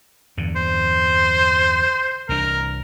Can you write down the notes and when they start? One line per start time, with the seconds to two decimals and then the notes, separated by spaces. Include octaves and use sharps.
0.37 E2 G2 D3
0.56 C5
2.29 C2 E3 D4 A#4